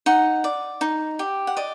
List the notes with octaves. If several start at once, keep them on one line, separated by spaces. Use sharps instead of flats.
D#4 F#5
D5
D#4
G4
F#5
D5 D#5